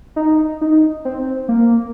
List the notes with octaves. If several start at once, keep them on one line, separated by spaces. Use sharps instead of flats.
D#4
D#4
C4
A#3